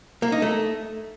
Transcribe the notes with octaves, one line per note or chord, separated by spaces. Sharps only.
A#3
D#4
A3